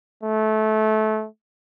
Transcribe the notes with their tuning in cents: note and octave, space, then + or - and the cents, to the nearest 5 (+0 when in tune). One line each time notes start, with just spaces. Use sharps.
A3 -20